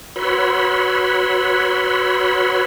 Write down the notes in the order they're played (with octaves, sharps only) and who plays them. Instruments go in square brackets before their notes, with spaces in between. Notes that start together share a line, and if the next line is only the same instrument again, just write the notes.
[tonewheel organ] F#4 B4 C#5 B5 C6 E6